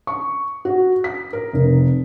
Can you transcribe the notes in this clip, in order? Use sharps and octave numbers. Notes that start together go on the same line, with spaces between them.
C#6
F#4
B6
A#4
F1